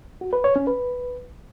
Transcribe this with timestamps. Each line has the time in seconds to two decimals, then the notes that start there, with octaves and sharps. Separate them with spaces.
0.21 F#4
0.33 B4
0.44 C#5
0.56 C#4
0.67 B4